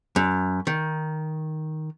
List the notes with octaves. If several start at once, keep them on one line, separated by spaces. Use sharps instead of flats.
F#2
D#3